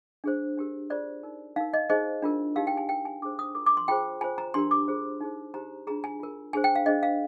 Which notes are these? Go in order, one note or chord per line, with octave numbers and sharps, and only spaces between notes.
D4 G#4 C5
D4 G4 A#4
F4 G#4 C5 D5
D#4 A#4
D#4 A#4 F5
D#5
D#4 G#4 C5 D#5
D4 F4 A#4
D#4 G4 A#4 F5
G5
G#5
D#4 A#4 G5
G#5
D4 G#4 C5 D6
D#6
F4 A#4 D6
D6
C6
F4 G#4 C5 G5
F4 C5 G#5
A#5
D4 G4 A#4 C6
D6
F4 G#4 C5
D#4 G#4 C5
D#4 G4 C5 A#5
D4 F4 G#4 A#5
G#5
F4 A#4
D4 G#4 C5 G#5
G5
F5
D4 G#4 C5 D#5
F5